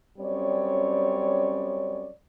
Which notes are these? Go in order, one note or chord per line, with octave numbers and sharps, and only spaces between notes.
F#2 G3 C4 C#4 C#5 D5